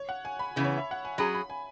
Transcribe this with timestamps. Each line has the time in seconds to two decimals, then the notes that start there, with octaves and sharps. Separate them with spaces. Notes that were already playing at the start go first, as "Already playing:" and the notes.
Already playing: C#5
0.09 F#5
0.25 G#5
0.39 B5
0.56 C#3 E3 B3
0.64 C#5
0.78 E5
0.91 F#5
1.05 G#5
1.18 F#3 C#4 G#4 B5
1.35 B5
1.50 G#5